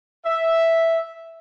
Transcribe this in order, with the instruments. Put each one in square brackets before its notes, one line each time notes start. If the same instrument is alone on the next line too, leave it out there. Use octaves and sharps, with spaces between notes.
[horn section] E5